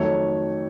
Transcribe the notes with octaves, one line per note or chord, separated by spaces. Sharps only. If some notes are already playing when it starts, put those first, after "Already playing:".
Already playing: F2 D#3 F#3 A3 C#5